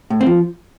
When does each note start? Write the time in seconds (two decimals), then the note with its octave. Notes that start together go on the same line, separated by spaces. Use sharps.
0.10 A2
0.21 C4
0.26 F3